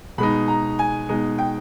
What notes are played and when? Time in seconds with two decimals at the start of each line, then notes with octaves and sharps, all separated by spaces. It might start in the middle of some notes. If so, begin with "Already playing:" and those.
0.18 B2 G#3 D#4 B5
0.48 A#5
0.79 G#5
1.09 B2 G#3 D#4
1.38 G5